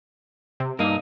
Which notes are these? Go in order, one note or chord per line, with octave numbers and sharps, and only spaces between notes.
C3
G2 A#3 D#4